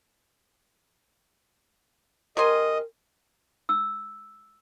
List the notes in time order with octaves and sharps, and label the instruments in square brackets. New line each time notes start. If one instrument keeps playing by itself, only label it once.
[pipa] C3 G#5 C6 [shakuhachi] A#4 [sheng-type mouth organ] D#5
[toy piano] E6